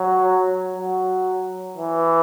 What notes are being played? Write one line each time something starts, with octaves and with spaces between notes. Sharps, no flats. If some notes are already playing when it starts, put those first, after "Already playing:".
Already playing: F#3
F#3
E3